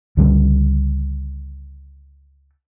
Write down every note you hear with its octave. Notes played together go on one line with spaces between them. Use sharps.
C#2 D3 G3